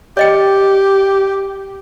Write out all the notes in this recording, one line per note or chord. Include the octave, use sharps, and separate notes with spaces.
G4 C#5 D#5 G5